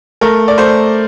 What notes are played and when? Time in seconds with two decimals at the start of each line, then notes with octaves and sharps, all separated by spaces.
0.21 A3 A#4
0.48 D5
0.58 A3 C5